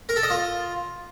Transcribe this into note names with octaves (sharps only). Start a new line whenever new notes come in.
A#4
A4
D#5
F4